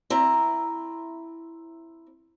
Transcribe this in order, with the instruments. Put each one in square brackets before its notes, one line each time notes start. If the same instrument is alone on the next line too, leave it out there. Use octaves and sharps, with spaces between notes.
[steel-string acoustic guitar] C4 E4 A#5